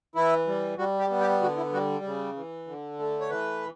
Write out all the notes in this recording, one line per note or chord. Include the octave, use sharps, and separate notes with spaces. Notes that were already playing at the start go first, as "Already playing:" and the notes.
E3 E4
G3
G3 F#4
G4
B3
G4
D3 F#4
E4
G3 F#4
C#3
E3
D3
A3
C#5
E3 B4